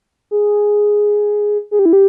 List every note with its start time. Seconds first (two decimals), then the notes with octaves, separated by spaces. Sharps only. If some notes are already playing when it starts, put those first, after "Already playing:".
0.31 G#4
1.71 G#4
1.79 G4
1.86 E4
1.93 G4